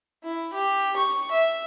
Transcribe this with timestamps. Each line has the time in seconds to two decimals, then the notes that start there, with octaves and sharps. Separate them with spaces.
0.24 E4
0.54 G4
0.97 C#6
1.31 E5